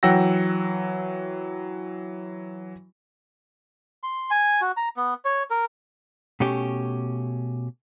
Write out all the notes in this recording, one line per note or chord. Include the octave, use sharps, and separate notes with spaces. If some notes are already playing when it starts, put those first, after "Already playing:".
E3 F#3 F#5 G5 E6 A#6
C6
G#5
F#4
A#5
B3
C#5
A#4
B2 A3 C#4 G4